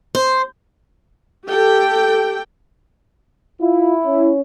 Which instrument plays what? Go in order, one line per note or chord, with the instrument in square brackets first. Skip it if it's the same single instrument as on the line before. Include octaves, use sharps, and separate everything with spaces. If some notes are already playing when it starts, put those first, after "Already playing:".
[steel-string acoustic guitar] C5
[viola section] G4 A4 G5
[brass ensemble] E4 [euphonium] F4
[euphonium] C#4